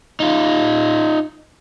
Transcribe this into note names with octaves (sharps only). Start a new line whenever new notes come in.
D#4 F4